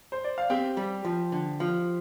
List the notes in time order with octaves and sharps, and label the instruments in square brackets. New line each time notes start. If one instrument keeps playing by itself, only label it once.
[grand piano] C5
D5
F5
[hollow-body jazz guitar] C4 [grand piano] G4 G5
[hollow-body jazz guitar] G3
F3
D3
F3